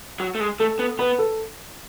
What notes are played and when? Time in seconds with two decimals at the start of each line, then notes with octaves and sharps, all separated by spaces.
0.20 F#3
0.35 A3
0.40 G#3
0.60 A3 A4
0.79 B3
0.99 B3 B4
1.19 A4